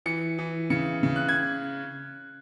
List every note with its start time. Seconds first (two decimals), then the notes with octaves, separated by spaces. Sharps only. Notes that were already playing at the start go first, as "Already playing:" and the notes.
0.06 E3 C#7
0.39 E3
0.70 C#3 C#7
1.03 C#3
1.16 F#6
1.29 G#6